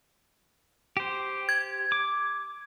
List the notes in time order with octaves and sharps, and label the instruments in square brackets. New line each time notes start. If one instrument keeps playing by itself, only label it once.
[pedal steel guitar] G4 C5
[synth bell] G#6
[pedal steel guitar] D6